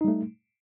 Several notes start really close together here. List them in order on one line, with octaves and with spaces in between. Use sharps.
D#4 G3 A3